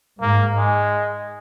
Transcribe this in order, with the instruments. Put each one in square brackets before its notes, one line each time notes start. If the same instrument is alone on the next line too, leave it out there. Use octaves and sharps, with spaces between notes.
[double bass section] G#2 [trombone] A#3
[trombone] G#3